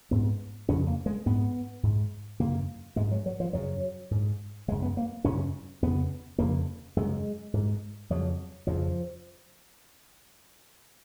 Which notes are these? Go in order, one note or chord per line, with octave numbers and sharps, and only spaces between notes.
G#2 B3
F2 C#3 C#4
A#3
G#3
G#2 B3
G#2
F#2 C#3 A#3
G#2 G#3
F#3
F#3
F3
F#2 C#3 F#3
G#2
F#2 C#3 G#3
B3
A#3
F#2 C#3 C#4
F2 C#3 B3
F2 C#3 A#3
F#2 C#3 G#3
G#2
F2 C#3 F#3
F2 C#3 F3